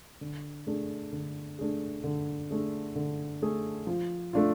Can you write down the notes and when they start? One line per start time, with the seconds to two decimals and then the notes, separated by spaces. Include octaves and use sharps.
0.21 D3
0.67 A3 D4 G#4
1.12 D3
1.59 A3 D4 G#4
2.04 D3
2.51 A3 D4 G#4
2.96 D3
3.42 A3 D4 G#4
3.87 F3
4.33 A3 D4 F4